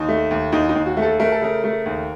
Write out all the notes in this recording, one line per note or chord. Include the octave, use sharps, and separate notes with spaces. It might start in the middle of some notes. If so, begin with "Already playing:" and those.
Already playing: D#2 D#4
A3
D#2
D#2 D#4
D#4
D#2
F#4
A3
A4
A3 A#4
A4
C#3 A#4
A3
D#2